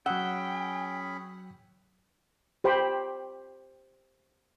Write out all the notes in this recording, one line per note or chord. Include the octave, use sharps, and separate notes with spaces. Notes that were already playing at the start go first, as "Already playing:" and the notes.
F#3 C#4 G#4 F#5 G5 B5 D#6 E6
G4 C5 G5 B5